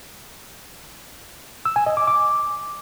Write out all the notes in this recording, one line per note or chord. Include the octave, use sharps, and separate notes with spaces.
E6
G#5
D#5
D6
D6